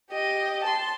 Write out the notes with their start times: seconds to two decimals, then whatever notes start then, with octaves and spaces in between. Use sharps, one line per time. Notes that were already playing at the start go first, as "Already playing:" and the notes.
0.12 G4 D#5
0.64 A5 C6